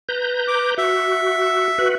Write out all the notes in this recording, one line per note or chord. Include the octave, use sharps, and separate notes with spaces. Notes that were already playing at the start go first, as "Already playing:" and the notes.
B4 A#5 G6
D6
F#4 E5
F#4 B4